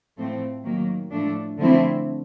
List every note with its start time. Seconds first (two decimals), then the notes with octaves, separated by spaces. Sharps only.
0.17 A2 F3 A3 C4
0.64 D#3 F#3 A#3
1.11 A2 F3 A3 D4
1.58 D3 F3 A3 C4 E4